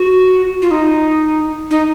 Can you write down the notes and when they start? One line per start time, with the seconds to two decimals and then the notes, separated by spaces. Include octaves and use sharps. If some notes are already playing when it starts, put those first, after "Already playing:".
Already playing: F#4
0.62 F4
0.71 D#4
1.71 D#4